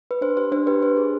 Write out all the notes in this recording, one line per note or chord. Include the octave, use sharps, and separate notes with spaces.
B4
D4 C5
G4 C5
D4 C5
G4 B4
D4 C5
G#4